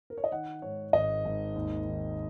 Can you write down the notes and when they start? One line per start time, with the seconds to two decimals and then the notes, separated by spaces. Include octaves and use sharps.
0.10 A#4
0.18 C#5
0.24 D#5
0.31 D#3 F#5
0.62 G#2 C#5
0.93 G#1 D#5
1.25 G#1
1.55 D#2
1.87 D#3